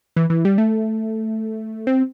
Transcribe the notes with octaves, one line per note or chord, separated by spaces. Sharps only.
E3
E3
G3
A3
C4